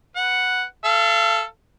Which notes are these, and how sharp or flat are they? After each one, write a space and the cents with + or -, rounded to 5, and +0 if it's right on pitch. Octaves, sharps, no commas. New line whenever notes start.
B4 -5 F#5 +0
A4 +0 F5 -35